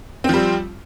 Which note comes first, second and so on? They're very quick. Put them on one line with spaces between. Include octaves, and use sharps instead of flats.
C4 F3 G3